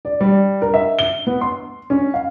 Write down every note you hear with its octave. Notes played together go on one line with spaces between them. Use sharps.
D5
G3
A#4
E5
G7
B3
C6
C#4
F5